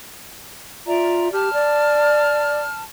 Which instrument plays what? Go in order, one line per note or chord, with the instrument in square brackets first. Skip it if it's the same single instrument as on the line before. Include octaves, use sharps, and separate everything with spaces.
[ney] F4 [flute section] D5 E5 A#5
[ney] G4 [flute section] A5 F6
[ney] D5